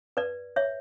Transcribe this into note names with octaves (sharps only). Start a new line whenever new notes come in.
B4 D5
C#5 E5